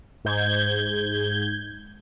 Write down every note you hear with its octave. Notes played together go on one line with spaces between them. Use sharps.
G#2 G6 G#6